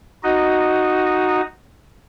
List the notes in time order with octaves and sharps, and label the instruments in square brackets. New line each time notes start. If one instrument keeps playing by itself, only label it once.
[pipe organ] D#4 F#4 D#5